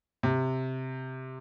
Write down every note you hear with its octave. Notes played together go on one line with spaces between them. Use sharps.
C3